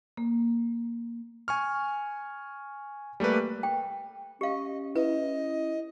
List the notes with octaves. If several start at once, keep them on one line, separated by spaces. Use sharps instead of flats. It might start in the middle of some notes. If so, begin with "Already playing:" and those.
A#3
G#5 C#6 F6
G3 A3 A#3 B4
G5
C#4 G4 D#5 F5
E4 B4 D#5